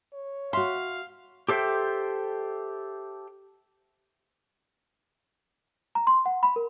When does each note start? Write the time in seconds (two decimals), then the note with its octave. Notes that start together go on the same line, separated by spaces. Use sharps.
0.13 C#5
0.53 F#4 E5 F5 C6
1.49 G4 A4 C5 E5 G5
5.95 A#5
6.07 C6
6.26 F#5
6.43 B5
6.56 A#4